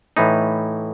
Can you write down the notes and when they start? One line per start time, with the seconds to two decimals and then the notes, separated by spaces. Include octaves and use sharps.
0.17 A2 E3 A3 D#4